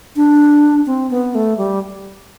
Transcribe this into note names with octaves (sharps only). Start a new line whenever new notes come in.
D4
C4
B3
A3
G3